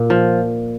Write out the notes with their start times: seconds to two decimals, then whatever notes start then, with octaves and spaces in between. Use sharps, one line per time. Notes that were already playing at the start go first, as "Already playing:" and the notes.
Already playing: A#2
0.10 F3